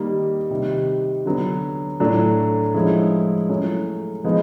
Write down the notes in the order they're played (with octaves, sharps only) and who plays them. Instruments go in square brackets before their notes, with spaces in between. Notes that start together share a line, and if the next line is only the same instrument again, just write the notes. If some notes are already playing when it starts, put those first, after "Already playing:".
Already playing: [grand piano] D#3 G3 A#3
C3 D#3 G3
D3 F#3 B3
A2 F#3 A3 D4
F3 G#3 C#4 E4
F#3 A3 C#4 E4
F3 G#3 B3 D#4